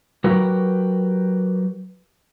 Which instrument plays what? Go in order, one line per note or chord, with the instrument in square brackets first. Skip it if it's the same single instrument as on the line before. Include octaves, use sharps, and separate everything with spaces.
[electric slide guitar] F#3 F#4 G4 A#4 B4